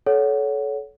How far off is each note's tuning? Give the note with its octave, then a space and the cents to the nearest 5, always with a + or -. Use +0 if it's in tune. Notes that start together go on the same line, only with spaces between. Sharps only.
A4 -30 C#5 +20 F#5 +0